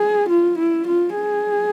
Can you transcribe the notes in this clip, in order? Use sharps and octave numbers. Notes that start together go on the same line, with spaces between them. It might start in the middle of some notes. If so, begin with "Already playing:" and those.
Already playing: G#4
F4
E4
F4
G#4